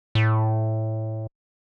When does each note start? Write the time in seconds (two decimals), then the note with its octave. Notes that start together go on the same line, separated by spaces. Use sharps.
0.15 A2